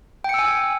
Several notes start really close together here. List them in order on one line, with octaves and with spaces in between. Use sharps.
G5 C#7 E6 G#5